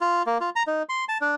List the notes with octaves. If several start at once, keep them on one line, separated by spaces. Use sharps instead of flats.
F4
A#3
F4
A#5
D#4
C6
A5
D4